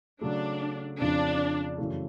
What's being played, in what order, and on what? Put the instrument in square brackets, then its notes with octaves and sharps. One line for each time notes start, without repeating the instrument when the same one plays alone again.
[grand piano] C#3 F#3 A3 [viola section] D4
[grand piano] F2 C#3 F3 [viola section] D4
[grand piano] F#2 C#3 E3 A3